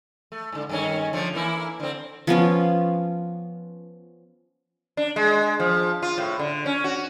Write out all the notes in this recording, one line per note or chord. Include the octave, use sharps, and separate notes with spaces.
A3
G#2 D3
G2 D#3 C#4
D3 F3 A3
E3 A#3 E4
D3 C4
F3 B3 C#4 F4
D4
G#3
F3
F4
A2
D3
C#4
F#4